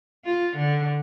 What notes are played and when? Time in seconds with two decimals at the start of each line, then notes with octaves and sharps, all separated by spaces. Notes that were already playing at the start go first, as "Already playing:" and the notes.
0.25 F4
0.57 D3